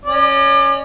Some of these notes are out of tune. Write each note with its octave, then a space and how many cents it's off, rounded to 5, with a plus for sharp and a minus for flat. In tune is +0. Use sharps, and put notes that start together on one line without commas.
C#4 +0 D5 +35